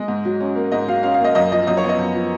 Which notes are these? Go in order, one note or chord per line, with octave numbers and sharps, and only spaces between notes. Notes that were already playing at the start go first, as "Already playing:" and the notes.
Already playing: G#3 D#5
G#2
F#3
C#4
A#3
G#2 D#5
F#3 F5
C#4 F5
F5
A#3 D#5
F#2 D#5
F3 D#5
F#2 D#5
C#5
B3
D#5
F#2
F3